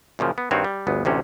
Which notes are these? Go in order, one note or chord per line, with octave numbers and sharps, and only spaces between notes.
F#2 A#2 C#3 F3
B3
G2 D#3 C4 F#4 C#5
G3
G1 D2 B3
A1 D2 C3 C#4